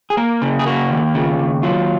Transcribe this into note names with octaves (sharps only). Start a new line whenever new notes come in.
G#4
A#3 A#4
C#3
G#4
A#3 F#4
D#2
C#3 F4
D#2
F#3 F4